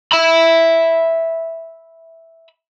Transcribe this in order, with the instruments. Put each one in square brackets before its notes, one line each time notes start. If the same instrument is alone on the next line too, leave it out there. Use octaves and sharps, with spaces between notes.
[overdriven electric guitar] E5 B5